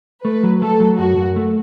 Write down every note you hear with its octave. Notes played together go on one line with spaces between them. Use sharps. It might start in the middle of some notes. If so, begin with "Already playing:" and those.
A3 B4
F#3
A3 A4
F#3
F#2 F#4
F#2
A3